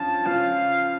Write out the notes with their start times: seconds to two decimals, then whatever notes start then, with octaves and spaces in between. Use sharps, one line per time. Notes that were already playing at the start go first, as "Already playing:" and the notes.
Already playing: G2 F3 C#4 F4 A5
0.25 C#3 F3 C#4 F4 F5